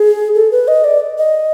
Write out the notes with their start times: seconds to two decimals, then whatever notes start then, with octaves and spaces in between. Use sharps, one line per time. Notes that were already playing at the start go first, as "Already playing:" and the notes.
Already playing: G#4
0.35 A4
0.52 B4
0.68 D#5
0.84 D5
1.18 D#5